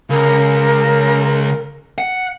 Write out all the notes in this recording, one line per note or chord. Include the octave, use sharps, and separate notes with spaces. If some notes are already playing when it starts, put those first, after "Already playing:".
C#2 A#4
F#5